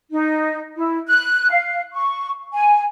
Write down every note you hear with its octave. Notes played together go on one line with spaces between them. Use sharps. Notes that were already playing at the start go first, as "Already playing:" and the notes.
D#4
E4
F#6
F5
C#6
G#5